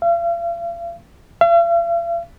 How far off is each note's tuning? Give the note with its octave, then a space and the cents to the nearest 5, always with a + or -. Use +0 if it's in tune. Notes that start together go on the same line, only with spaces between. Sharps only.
F5 -40
F5 -45